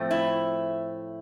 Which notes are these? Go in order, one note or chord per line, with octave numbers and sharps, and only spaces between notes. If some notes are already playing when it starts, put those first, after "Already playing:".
Already playing: A2 F3 A3 C4
E4